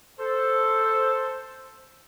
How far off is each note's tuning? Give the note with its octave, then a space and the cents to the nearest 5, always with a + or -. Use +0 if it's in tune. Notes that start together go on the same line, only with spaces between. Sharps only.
A4 +0 C5 +0